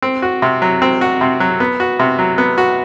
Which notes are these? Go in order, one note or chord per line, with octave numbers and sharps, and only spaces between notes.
C4
F#4
C3
F#3
C4
F#4
C3
F#3
B3
F#4
C3
F#3
B3
F#4